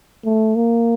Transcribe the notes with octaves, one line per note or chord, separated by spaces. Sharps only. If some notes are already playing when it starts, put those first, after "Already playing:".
A3
A#3